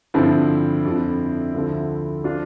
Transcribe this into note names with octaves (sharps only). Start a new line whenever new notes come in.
G2 D3 F3 C4 E4
F2 D3 F3
D2 D3 F3
F3 D4 F4